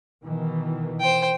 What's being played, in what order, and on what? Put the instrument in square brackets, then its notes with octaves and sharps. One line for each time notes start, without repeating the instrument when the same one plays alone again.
[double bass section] B2 D#3 E3
[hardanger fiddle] C5 G5